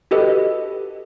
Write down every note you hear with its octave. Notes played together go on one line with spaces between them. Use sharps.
F#4 G4 A4 B4 D#5